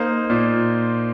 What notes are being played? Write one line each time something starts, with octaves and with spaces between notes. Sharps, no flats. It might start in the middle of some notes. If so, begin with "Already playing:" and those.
Already playing: A#3 D#4 C5
A#2